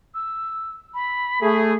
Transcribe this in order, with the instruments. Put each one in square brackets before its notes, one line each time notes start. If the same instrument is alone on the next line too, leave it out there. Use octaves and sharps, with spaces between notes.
[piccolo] E6
B5
[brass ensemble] A3 G#4